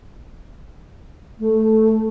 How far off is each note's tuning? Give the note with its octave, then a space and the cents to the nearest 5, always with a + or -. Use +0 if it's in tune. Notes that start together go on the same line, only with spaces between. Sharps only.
A3 +0